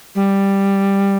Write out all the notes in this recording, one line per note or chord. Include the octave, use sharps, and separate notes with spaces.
G3